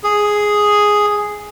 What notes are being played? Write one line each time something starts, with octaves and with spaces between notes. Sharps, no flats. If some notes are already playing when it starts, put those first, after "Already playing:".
G#4